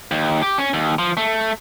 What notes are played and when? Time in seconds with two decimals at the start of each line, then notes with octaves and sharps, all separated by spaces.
0.11 D#2
0.42 G4
0.58 C#4
0.74 D#2
0.99 F3
1.17 A3